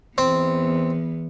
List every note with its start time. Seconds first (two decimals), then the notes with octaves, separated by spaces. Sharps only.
0.18 E2 B3 C4